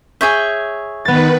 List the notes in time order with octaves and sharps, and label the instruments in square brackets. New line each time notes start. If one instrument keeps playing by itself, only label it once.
[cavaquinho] G#4 C#5 E5 [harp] G6
[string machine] D#3 B4 [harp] B3 A6